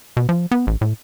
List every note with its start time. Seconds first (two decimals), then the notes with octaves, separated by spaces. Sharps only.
0.17 B2
0.29 F3
0.51 B3
0.67 A1
0.81 A2